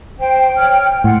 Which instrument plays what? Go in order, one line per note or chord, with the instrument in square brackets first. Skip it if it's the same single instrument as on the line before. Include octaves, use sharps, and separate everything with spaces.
[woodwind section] C5 [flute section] G5
[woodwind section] C#5 F6
[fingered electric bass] A2 [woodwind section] F4 F#5